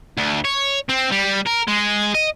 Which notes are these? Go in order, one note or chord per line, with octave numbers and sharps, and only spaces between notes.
D2
C#5
C4
G3
A#4
G#3
D#5